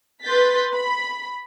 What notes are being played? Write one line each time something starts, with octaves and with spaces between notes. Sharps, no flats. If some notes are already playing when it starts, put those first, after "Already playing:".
B4 C6 G6 A6 B6
B5